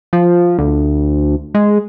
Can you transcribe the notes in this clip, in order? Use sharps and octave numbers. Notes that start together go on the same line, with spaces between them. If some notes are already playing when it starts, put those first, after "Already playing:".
F3
D2
G#3